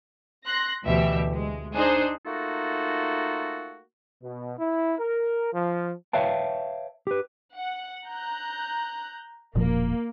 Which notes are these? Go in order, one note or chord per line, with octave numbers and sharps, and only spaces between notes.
C6 F#6 A#6
D2 B2 E3 G4 E5
G#3
D4 D#4 G#4 C5
A3 A#3 D#4 F4 F#4 A4
B2
E4
A#4
F3
B4 C#5 E5 F5 G5 A5
G4 B4
F#5
A#5 F#6 G6
E1 A#2 F3 A#3